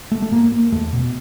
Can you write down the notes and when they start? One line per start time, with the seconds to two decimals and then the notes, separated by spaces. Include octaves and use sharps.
0.12 A3
0.22 A3
0.32 G#2 A#3
0.52 A#3
0.72 E2 A3
0.93 B2